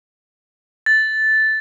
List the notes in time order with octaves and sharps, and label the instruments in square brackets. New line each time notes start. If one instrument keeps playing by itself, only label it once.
[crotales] A6